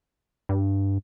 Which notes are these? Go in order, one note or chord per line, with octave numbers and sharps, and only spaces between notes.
G2